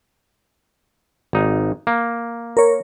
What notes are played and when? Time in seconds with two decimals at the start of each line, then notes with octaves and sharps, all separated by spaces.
1.33 G#1 D#4
1.87 A#3
2.57 A#4 C#5